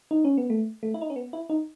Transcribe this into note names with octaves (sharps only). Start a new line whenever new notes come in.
D#4
C#4
B3
A3
A3
E4
D#4
C#4
B3
E4
D#4